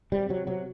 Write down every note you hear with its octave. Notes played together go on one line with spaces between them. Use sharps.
C3 G3
C3 F#3
C3 F#3